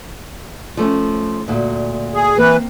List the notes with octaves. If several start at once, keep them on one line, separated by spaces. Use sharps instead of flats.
F3 A3 C#4
D2 A#2
G#4
E3 A#3 C4 B4